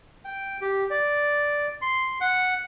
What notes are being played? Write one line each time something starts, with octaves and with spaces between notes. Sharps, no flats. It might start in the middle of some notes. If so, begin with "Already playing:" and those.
G5
G4
D5
C6
F#5